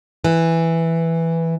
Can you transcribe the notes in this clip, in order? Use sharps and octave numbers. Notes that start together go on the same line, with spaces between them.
E3